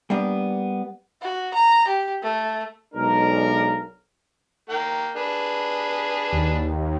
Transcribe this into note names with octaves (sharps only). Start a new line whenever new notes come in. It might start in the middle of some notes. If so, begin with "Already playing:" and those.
G3 A#3 B3 D4
F#4
A#5
G4
A3
B1 G#3 D4 A#4
A#3 G5
D4 G#4 B4
D#2